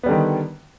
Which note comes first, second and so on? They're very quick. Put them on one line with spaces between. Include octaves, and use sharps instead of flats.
B3 G3 D3 D#3